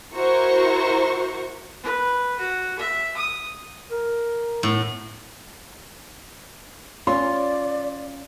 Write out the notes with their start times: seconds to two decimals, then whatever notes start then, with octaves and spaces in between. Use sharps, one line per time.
0.15 E4 F#4 A#4 C5 A#5 C#6
1.83 B4
2.39 F#4
2.79 E5
3.16 D#6
3.91 A#4
4.63 A2 B3
7.07 C#4 F4 D5 C6